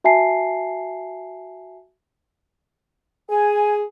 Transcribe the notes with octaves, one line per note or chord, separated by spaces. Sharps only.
F#4 E5 G#5 A5 C7
G#4 G#5